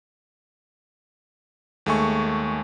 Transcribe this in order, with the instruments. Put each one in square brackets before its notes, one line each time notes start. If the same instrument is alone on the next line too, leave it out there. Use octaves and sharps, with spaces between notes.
[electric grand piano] D#2 G#3 A3 G#5 C#6